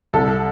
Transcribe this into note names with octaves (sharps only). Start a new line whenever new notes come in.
C2 A4